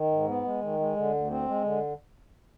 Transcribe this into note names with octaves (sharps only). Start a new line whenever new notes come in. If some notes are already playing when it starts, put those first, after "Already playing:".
Already playing: D#3
G#2
B3
G#3
D#3
G#3
D3
D2
C4
G#3
D3